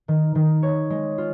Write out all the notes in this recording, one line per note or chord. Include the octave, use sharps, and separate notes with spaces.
D#3
D#3
C#5
G#3
F4